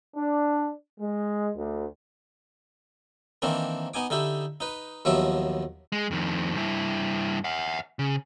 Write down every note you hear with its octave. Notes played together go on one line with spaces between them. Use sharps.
D4
G#3
D2
D#3 E3 A#3 C4 D4
B3 D#4 G#5 D6
D3 D#4 E4 G4
D#4 B4
D#2 F3 F#3 B3 E5 D6
G#3
F2 D#3
G2 E4
E5 F#5
C#3